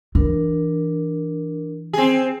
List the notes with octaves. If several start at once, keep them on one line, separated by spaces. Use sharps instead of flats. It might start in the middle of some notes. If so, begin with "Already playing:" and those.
E3 D4 A#4
C4 G#4